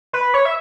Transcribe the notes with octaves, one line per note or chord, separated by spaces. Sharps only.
B4
C#5
E5